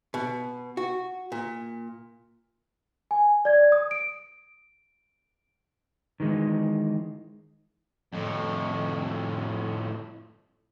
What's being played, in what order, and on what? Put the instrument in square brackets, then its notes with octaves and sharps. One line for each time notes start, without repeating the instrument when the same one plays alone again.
[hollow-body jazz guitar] B2
F#4
A#2
[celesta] G#5
D5 G#6
D#6
D7
[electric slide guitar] D#3 E3 G#3
[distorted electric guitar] F2 A2